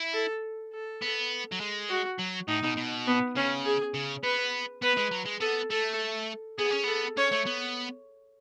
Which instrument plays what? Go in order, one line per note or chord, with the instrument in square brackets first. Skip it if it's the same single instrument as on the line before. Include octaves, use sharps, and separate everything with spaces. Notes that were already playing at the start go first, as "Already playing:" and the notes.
Already playing: [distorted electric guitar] E4
[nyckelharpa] A4
A4
[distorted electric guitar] B3
F#3
G#3
[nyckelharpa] F#4
[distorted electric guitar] F#3
[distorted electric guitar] A2 [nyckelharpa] D#4
[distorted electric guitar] B2
B2
[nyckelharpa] B3
[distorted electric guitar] C#3 [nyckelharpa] C#4
[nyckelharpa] G#4
[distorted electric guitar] C#3
[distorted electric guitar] B3 [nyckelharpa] B4
[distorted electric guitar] B3 [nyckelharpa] B4
[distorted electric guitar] G#3
F#3
G#3
[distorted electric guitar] B3 [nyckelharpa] A4
[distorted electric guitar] A3 [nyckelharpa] A4
[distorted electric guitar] B3 [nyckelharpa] G#4
[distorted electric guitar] C#4
[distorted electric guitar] B3 [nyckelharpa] A4
[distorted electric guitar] C#4 [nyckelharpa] C#5
[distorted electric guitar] A3
B3